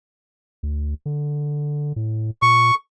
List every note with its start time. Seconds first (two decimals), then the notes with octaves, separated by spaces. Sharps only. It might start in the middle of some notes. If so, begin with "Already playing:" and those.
0.63 D2
1.06 D3
1.96 A2
2.42 A#2 C#6